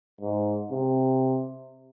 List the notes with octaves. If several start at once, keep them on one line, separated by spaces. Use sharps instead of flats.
G#2
C3